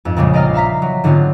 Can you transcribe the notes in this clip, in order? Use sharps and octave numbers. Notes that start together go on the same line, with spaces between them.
F2 G#2
A#1 A#2 C#3 G3 G#3
A#4 D5 D#5 F5 A#5 F6
E5 F5 A#5 B6
F#3
G#2 D3 F#3 B3 C4 F4